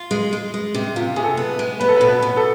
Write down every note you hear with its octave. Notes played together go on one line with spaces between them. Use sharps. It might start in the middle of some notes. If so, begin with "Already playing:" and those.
Already playing: F4
G#3
G#3
G#3
C3
C3 F4
C3 G#4
A4
B3
G#3
B3 B4
A4
B4
B2
B4
B2
A4